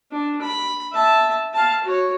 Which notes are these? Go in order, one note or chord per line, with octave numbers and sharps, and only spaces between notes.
D4
B5
E5 A5
F5 A5
F#4 C#5